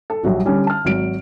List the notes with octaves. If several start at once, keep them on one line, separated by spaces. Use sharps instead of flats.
A4
A#1 F#3 G3
D3 G3 C#4
A5 F6
G#1 F#3 D7